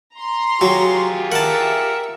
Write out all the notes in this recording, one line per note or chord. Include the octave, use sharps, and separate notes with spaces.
A#5 C6
F#3 F4 G4 G#4
A#4 E5 F#5 A5 C#7